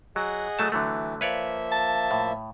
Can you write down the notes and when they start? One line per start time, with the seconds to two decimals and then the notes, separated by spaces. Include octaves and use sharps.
0.16 F#3 G#4 D#5 F#5
0.59 F#3 A3 A5
0.72 D3 E3 F#3 A3
1.21 F3 A#3 B4 C#5 D5 E5
1.72 A5
2.11 A2